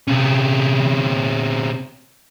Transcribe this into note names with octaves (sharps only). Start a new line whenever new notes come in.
C3 C#4